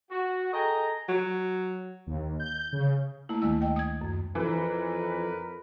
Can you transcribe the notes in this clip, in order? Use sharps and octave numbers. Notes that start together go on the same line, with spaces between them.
F#4
G#4 A4 D#5 G5 G#5 A#5
F#3
D#2
G6
C#3
A3 A#3 E4
D2 D#3 G#3 A5 E6
D#5 G5
D#6 G#6
F#2
F2 E3 A#4 B4